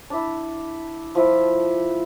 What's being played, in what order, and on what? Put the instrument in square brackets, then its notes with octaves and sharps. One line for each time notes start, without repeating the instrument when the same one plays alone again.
[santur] D4 E4
F3 E4